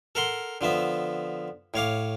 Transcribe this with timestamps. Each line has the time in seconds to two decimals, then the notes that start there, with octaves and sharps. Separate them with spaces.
0.15 A4 A#4 F#5 C6
0.61 D3 F3 B3 E5
1.74 A2 C#5 F5 D6